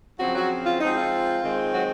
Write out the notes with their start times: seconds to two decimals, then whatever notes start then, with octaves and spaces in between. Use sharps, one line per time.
0.19 C#3 F3 F#3 C4 F#4
0.35 F#3 F#4
0.65 F4
0.81 F3 G#3 C4 D#4
0.96 F4
1.41 D#3 G#3 C4
1.71 F#3 F#4